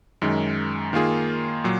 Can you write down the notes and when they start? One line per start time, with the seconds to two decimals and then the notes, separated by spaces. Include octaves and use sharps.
0.22 F#2 D#3 G#3
0.93 D#3 A#3 F4 G#4
1.64 A#2 F#3